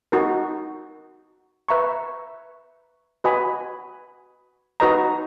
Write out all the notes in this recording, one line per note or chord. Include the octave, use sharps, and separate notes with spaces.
D#4 F#4 A#4
B4 E5 A#5 C#6
F#4 B4 D#5 G#5 B5
D#4 F#4 B4 D#5 A#5